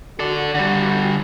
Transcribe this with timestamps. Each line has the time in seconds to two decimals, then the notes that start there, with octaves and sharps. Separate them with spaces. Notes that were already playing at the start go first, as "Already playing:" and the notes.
0.19 F#4 A4 D5
0.55 D3 G3